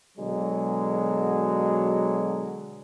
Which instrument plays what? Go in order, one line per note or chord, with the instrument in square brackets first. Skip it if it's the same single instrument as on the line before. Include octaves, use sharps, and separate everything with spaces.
[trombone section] B2 D3 F#3 G#3